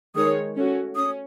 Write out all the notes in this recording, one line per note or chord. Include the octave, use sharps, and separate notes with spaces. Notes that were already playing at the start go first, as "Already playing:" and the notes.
D#3 G#3 D#4 G#4 C#5 D#6
A3 C#4 F#4
C#4 D#6